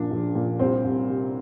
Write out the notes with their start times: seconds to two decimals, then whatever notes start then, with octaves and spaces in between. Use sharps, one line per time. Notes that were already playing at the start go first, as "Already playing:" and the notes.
Already playing: A#1 A#2 D4
0.11 A#1
0.35 A#2
0.59 C2 C4
0.84 C2
1.09 C3